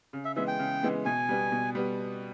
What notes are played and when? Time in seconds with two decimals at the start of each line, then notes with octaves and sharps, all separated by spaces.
0.13 C#3
0.25 E5
0.36 E3 G#3 B3 E5
0.48 G5
0.59 C#3
0.83 E3 G#3 B3
1.05 B2 G#5
1.29 G3 B3
1.52 B2
1.75 G3 B3